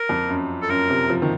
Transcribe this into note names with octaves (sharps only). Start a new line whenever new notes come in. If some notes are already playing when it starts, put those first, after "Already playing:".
Already playing: A#4
F2
F#2
A4
F#2 A#4
C3
F3
D#3